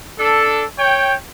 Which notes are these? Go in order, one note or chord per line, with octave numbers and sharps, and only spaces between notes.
D4 A4
C#5 G5